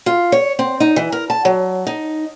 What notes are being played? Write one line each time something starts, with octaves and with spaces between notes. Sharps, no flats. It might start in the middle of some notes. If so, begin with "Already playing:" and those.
F4
C#5
C4
D#4
E3
A#4
A5
F#3
D#4